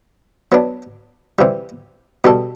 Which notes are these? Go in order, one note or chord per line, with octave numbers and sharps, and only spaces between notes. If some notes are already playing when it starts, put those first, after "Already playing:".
F#3 B3 D4
C3 E3 G3
B2 G3 D4 A4